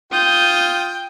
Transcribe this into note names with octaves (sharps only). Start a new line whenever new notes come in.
F4 G5 D#6 G6